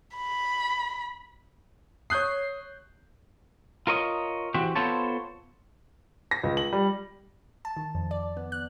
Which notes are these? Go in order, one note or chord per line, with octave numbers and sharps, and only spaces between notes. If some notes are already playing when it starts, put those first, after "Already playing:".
B5
C#5 D#6 F#6 G6 C7
F4 A#4 C#5 D#5
E3 C4 F#4 G4
B3 F4 A4 C5 C#5 A5
A#6
C#2
F#7
G3
A5
D#3
F2
D5
B3
F#6